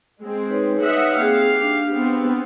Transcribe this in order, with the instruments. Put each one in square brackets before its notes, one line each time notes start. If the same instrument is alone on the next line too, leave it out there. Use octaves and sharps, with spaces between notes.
[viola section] G#3 C4
[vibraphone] D#4 B4 C#5
[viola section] D#5 E5 F#5
[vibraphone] A#3 C4 G#4 [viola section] G4 F5
[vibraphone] D4
[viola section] B3 C4